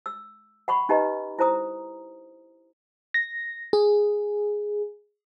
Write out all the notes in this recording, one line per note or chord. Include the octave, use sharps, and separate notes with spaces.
E6
F#5 B5 C#6
C#4 D#4 G4 B4 D#5 A#5
E4 C5 A#5 D#6
A#6
G#4